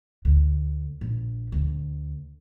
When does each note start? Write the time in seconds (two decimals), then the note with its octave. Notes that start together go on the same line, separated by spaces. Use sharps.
0.25 D2
1.01 A#1
1.52 D2